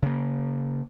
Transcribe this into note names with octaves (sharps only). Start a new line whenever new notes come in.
C#3 A#3